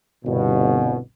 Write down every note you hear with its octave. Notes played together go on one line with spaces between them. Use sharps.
G1 C2 B2